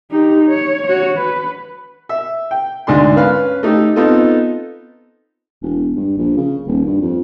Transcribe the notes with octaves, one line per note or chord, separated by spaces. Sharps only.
D#4 G4
C#5
F#4 C#5
B4
E5
G5
D2 G#2 D4 C6
C#4 B4 F5
A3 D#4 G4 A4
B3 C4 D#4 F4 A4 D#5
E1
G2
A#1
C#3
D#1
G2
F2